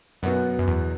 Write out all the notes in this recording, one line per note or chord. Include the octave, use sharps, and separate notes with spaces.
F#2 B2 F#3 B3 F#4
F#2
E2